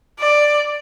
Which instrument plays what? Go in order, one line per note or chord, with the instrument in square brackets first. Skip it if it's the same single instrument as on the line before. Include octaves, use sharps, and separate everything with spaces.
[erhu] D5